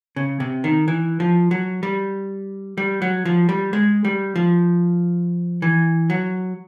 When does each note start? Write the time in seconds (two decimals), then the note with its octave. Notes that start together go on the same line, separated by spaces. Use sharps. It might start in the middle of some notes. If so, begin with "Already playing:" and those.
0.16 C#3
0.40 C3
0.64 D#3
0.88 E3
1.20 F3
1.51 F#3
1.83 G3
2.78 G3
3.02 F#3
3.25 F3
3.49 G3
3.73 G#3
4.05 G3
4.36 F3
5.62 E3
6.10 F#3